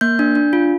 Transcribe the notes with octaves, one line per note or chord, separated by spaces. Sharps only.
A#3 G6
D4
D4
F4